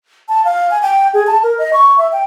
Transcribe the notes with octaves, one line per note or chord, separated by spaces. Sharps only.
A5
F5
G#5
G5
G#4
A5
A#4
D#5
C#6
E5
G5